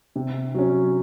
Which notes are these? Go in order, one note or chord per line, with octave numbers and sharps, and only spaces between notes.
C3
F#3 C#4